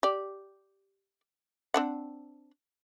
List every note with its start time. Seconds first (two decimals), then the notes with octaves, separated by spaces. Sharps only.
0.03 G4 D5
1.74 C4 D4 F#5